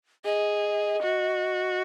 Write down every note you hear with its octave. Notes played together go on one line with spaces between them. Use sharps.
G#4 D#5
F#4